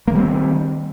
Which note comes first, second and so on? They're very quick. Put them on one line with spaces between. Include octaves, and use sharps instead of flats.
A#3 D#3 G3 C4